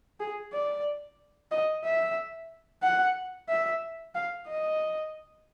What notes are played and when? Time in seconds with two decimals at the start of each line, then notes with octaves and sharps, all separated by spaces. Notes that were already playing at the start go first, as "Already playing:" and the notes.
0.20 G#4
0.53 D5
1.51 D#5
1.84 E5
2.83 F#5
3.49 E5
4.15 F5
4.48 D#5